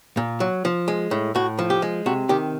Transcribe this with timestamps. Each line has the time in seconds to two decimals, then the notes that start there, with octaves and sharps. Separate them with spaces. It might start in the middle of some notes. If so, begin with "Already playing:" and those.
0.17 A#2
0.40 F#3
0.65 F3
0.88 G#3
1.11 A2
1.35 A2 F#4
1.59 F3
1.70 G4
1.82 G#3
2.06 C3 F#4
2.29 D#3 G4